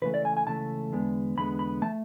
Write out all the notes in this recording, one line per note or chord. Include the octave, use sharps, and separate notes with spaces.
C#2 C#3 E3 A3 B4
D5
G#5
G#5
C#2 C#3 E3 A3 A5
E2 D3 G#3 B3
E2 D3 G#3 B3 B5
B5
E3 A3 A5